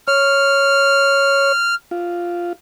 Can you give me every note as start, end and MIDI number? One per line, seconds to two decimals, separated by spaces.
0.08 1.52 73
0.08 1.75 89
1.91 2.53 65